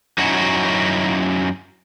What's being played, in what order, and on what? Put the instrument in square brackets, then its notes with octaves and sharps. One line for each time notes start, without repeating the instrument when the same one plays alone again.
[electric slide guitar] F#2 C#4 D#4 E4 F#4